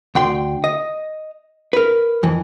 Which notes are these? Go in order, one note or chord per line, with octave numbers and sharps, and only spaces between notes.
D2 G5 C6
D#5
A#4 B4
F2 E3